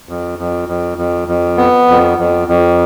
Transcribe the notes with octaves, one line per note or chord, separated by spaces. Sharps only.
F2
F2
F2
F2
F2
B3
F2
F2
F2